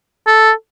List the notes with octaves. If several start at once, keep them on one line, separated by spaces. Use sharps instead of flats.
A4